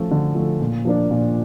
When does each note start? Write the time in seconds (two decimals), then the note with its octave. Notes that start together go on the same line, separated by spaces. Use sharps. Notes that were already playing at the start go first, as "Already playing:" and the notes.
Already playing: F3 A3 C#4
0.11 D3
0.35 F3 A3
0.60 A#2
0.85 F3 A#3 D4
1.11 A#2